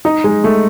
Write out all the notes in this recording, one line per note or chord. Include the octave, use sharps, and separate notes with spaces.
D#4
G#3
A3